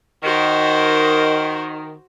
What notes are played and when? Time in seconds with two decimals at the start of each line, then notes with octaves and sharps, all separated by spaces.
0.24 D#3 F#4 C5